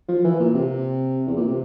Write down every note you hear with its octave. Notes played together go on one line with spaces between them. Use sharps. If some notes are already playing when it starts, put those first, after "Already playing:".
F3
E3
A#2
C3
E2
A#2
C3